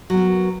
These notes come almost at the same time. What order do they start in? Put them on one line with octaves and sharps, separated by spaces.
F#3 B3 A#4